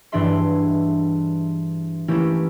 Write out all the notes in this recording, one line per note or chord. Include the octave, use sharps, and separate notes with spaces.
G2 E3 D4 G#4 E5 C6
E3 A3 A#3 C#4 E4 G4